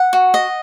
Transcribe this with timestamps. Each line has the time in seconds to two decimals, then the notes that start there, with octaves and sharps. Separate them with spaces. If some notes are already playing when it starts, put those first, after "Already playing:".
Already playing: F#5
0.13 F#4
0.34 D#5